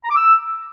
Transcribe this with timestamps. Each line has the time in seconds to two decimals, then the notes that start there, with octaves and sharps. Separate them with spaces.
0.04 A#5
0.10 D6
0.16 E6